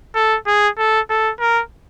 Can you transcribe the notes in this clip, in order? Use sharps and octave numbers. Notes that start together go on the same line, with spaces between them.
A4
G#4
A4
A4
A#4